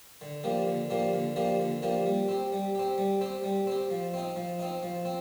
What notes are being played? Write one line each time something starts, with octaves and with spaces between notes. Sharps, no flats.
D3
F3 A#3 D4 G4
D3
F3 A#3 D4 G4
D3
F3 A#3 D4 G4
D3
F3 A#3 D4 G4
G3
C4 G4
G3
C4 G4
G3
C4 G4
G3
C4 G4
F3
C4 D#4
F3
C4 D#4
F3
C4